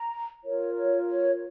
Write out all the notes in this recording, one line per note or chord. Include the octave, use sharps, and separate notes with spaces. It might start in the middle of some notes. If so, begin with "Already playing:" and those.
Already playing: A#5
F4 A#4 C#5
C#5
C#5